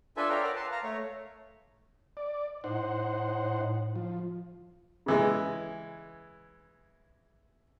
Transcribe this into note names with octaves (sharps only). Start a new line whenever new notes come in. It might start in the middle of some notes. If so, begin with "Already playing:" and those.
D4 F4 A4 B4 E5 G#5
C#5 D5 E5 F5 G5 A#5
A#4 F#5 A#5 D6
B4 A5 C6
F5 A#5
A3 C#5
D5
A2 D#4 C5 F#5
F3
C#3 E3 G#3